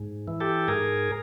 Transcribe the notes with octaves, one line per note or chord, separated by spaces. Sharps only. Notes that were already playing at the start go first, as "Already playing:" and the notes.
Already playing: G#2
E3
G4 A4
G#2 G#4 A#4